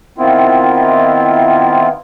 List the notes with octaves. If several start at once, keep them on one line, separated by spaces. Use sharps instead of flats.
D#3 B3 C4 E4 F4